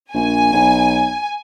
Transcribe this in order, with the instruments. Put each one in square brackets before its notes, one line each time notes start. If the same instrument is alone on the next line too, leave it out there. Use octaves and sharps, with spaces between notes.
[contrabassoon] A#1 [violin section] G#5
[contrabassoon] B1